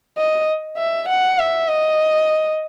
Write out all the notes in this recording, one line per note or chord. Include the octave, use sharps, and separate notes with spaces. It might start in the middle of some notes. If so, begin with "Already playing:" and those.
D#5
E5
F#5
E5
D#5